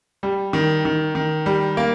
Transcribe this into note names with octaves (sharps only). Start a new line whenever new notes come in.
G3
D#3
D#3
D#3
G3
A#3